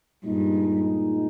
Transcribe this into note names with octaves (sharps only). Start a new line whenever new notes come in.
G2 A#2 G#3 D#4